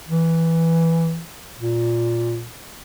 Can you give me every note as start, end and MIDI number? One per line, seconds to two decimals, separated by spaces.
0.08 1.20 52
1.58 2.45 46